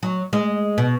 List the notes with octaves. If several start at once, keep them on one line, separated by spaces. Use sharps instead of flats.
F#3
G#3
B2